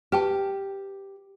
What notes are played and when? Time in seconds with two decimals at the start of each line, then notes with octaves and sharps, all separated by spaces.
0.12 G4 B4 G5 A5